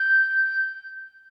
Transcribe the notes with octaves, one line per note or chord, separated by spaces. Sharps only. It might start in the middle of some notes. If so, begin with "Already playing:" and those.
Already playing: G6